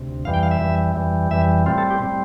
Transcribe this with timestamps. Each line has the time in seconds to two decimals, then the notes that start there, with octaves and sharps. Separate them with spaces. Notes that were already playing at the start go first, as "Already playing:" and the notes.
Already playing: D2 C3
0.25 F2 E3 G3 F5
0.34 G5
0.43 F5
0.51 E5
0.60 F2 E3 G3
0.95 F2 E3 G3
1.30 F2 E3 G3 E5
1.66 A2 G3 C4 F4
1.78 A4
1.91 G4
2.02 A2 G3 C4